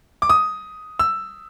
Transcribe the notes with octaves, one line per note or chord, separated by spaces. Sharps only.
D6
D#6
E6